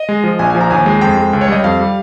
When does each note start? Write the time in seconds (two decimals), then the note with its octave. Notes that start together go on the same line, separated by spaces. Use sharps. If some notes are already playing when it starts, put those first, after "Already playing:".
Already playing: D#5
0.09 G#3
0.24 F3
0.39 A#1 G#5
0.50 F3 G#5
0.61 A#5
0.70 D#2 G#5
0.86 G#3
1.01 F2 G5
1.17 G#3
1.33 C#2
1.41 C#5
1.48 G3 D#5
1.64 F2 F5
1.80 G3